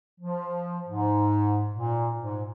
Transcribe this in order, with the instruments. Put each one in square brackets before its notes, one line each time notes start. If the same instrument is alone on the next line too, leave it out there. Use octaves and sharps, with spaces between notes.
[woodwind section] F3
G#2
A#2
G#2